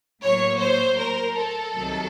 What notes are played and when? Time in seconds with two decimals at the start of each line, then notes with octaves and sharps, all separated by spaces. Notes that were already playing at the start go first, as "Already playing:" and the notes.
0.22 A2 F#3 A#3 C#5
0.60 C5
0.98 A#4
1.36 A4
1.74 C2 C3 D#3 F#3